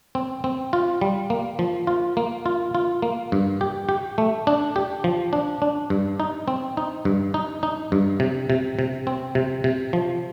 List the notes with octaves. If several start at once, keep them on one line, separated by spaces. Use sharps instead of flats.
C4
C4
F4
G3
A#3
F3
F4
A#3
F4
F4
A#3
G2
G4
G4
A3
D4
G4
F3
D4
D4
G2
D#4
C4
D#4
G2
D#4
D#4
G2
C3
C3
C3
C4
C3
C3
F3